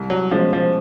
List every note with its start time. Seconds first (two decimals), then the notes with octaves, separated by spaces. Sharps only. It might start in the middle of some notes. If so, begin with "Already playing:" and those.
Already playing: C2
0.10 F#3
0.31 B2 F3 G#3 C#4
0.53 F3